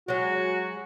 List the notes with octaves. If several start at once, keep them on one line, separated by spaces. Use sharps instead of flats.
F#3 G#3 F#4